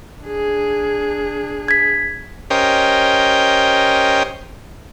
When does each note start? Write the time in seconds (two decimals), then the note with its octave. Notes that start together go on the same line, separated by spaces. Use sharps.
0.25 D4 G#4
1.68 G#6 B6
2.50 C#4 G4 A#4 C5 D#5 G5